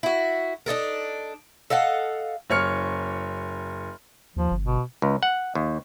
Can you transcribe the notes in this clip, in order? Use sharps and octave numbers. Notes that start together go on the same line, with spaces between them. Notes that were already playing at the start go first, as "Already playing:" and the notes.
E4 F#4
D4 D#4 A4 A#4
A4 D#5 F5 F#5
F#1 C#5 F6 C#7
D#2 F3
G1
B2
C#2
F#5
D#2